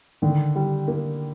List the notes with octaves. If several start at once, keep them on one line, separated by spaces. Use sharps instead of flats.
D3 D#3
G3
A#3